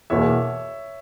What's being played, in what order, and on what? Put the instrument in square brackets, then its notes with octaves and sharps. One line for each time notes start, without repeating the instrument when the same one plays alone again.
[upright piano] E2 B2 A#3 [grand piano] C#5 E5